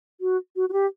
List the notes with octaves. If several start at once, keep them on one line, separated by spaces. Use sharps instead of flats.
F#4
F#4
F#4
G4